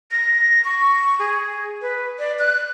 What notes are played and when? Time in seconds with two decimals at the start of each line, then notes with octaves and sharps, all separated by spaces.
0.11 A#6
0.65 C#6
1.19 G#4
1.82 B4
2.19 D5
2.39 F#6